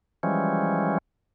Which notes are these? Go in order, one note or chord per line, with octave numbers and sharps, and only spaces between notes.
E3 F3 G3 G#3 C#4